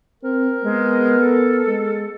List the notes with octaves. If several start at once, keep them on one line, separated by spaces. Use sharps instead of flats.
C4 A#4
G#3 B3
A4
G#3